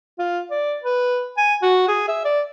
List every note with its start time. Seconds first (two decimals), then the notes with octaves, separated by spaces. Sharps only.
0.19 F4
0.51 D5
0.83 B4
1.37 G#5
1.62 F#4
1.88 G#4
2.08 E5
2.25 D5